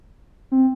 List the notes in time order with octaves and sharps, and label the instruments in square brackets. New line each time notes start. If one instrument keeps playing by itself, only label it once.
[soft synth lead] C4